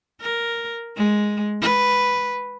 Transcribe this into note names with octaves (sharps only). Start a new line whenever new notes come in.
A#4
G#3
B4